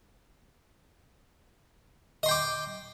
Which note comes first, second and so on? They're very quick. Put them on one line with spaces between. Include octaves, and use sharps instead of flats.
D#5 C6 G5 D6